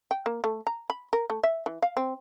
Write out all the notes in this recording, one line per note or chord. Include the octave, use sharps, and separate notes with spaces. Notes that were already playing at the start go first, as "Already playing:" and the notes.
G5
A#3
A3
A#5
B5
A#4
A3
E5
E3
F5
C4